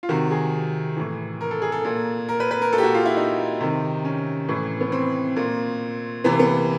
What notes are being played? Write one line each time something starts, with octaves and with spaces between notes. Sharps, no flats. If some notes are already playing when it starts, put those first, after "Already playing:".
F4
C3 D#3 F#4
G#4
A2 E3
A#4
A4
G#4
A4
A#2
A#4
B4
B4
A#4
A#2 A4
G4
F#4
F4
E4
D#4
C3 D#3
C#4
A2 E3
B3
C4
A#2
C3 E3 B3
A#3
B3